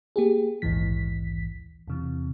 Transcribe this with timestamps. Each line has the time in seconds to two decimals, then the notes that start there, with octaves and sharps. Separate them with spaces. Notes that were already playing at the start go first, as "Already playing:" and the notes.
0.16 A#3 G4 G#4
0.62 A#1 D#2 G#2 E3 B6
1.88 E2 C3 E3